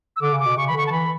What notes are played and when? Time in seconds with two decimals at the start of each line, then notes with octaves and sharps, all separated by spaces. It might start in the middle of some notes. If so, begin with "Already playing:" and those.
0.16 E6
0.22 D3 D6
0.33 C#3
0.40 D6
0.46 B2
0.57 C#3 C#6
0.67 E3 B5
0.74 D3 C#6
0.86 A5
0.92 E3 B5